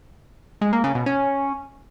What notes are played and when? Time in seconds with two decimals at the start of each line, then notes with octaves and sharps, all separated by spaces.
0.61 G#3
0.73 A#3
0.84 C#3
0.95 B2
1.06 C#4